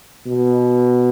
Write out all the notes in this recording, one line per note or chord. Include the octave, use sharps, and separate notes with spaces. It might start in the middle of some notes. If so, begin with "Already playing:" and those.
B2